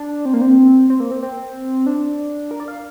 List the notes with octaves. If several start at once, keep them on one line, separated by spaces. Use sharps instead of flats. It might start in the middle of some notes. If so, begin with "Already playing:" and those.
Already playing: D4
C4
A#3
C4
C4
A#3
C4
C4
D4
A#4
D5
F5